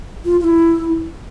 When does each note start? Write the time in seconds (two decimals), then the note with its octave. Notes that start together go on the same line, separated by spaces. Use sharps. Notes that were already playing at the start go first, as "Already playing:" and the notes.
0.25 F4
0.40 F4
0.44 E4